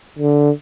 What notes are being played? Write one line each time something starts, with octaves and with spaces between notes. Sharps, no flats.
D3